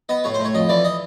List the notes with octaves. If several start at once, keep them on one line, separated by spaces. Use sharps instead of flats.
B3 D#5
A2 C#5
C5
A2
C#5
F2 D#5
E3 D5
D#5